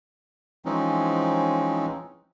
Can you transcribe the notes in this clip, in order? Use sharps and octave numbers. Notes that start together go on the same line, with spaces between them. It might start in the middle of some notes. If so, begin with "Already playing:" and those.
E3 F3 G#3 C4 C#4 D#4